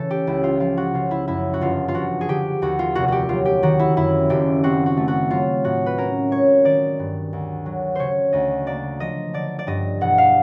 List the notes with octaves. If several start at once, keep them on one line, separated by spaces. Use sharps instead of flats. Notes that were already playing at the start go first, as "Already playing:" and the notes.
Already playing: C#3 E3 A4
G4
C#2 E4
F4
F3 F4
F#4
C#3 F4
E4
F#2 E4
F#4
G1 F4
F4
F3 F#4
G#4
D3 G4
D#2 F#4
F4
F1 F#4
F#4 G4
F#3 F4
G4
D#3 F#4
E4
F#2 E4
F#1 G4
C4 F#4
F#4
A3
F#4
F#3 F4
A2 F#4
B4
C#4 A#4
G#3 C#5
D#3 D5
G2
D2
F#3
C#3 C5 C#5
D2 D#5
A#3 D5
F3 D#5
D3 D5
D5
G2 D#5
E1 F#5
F5